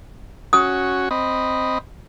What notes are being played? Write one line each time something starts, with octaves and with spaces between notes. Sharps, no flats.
C#4 F#4 D#6
C4 D#5 B5